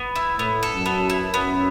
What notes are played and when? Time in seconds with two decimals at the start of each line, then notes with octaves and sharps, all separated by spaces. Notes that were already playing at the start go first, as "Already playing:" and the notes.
Already playing: B3
0.16 E4
0.38 A2 B3
0.63 A4
0.74 F#2
0.86 B3
1.10 E4
1.34 B3